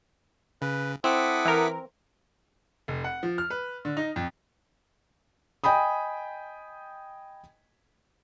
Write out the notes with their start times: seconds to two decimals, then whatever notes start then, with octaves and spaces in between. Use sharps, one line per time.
0.62 C#3 B4
1.04 C4 E4 A4 F#5 D6 D#6 B6
1.45 E3 A#4
2.88 F1
3.04 F#5
3.23 F3
3.38 F6
3.50 B4
3.85 D3
3.97 D#4
4.16 F2
5.64 D#5 G5 G#5 B5 D#6